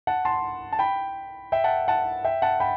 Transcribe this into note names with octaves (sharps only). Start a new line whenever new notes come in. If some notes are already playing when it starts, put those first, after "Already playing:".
F#5 A5
A5 C6
A5
G5 B5
E5 G5
F#5 A5
F#5 A5
E5 G5
F#5 A5
G5 B5